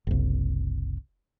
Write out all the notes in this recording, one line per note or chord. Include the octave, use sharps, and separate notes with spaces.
F#1 C2